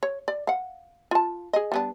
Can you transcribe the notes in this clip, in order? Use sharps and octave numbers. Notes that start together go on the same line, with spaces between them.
C#5
D5
F5 F#5
F4 A5
G#4 D#5
G3 B3 D4